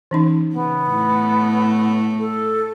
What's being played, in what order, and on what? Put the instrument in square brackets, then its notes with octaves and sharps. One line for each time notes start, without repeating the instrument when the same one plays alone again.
[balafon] E3 C#4 D#4
[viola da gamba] C#3 [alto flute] B3
[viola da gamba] A2 A3
[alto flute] A4